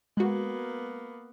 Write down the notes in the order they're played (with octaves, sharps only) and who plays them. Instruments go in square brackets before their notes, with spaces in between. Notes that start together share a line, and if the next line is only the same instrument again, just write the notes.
[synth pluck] G#3 F#4 [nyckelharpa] A#3 B3